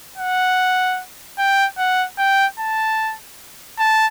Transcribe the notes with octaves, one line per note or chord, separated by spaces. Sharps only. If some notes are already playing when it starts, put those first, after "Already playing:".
F#5
G5
F#5
G5
A5
A5